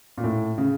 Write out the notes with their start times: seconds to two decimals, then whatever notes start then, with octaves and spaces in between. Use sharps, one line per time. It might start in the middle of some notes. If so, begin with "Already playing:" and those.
0.18 A#2
0.24 A2
0.58 C#3